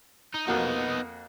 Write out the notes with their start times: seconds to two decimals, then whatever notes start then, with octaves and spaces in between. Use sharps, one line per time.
0.34 D#4
0.47 F2 A#3 B3 D#4 F#4